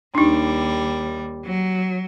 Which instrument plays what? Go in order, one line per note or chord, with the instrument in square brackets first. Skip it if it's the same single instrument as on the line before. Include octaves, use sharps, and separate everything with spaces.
[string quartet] D#2 G3 [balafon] D4 D#4
[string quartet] F#3